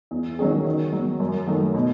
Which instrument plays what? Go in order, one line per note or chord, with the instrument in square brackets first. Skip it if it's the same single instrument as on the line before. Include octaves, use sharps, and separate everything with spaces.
[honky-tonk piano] E2
D#3 F#3 C#4 G#4
D#3
F#3 B3
F#2
D#3 F#3 A3
B2